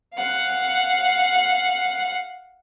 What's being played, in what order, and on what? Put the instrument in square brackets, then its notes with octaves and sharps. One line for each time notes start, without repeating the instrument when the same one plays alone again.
[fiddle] F5 F#5